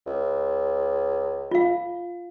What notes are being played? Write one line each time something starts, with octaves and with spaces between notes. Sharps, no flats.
C#2
F4 F5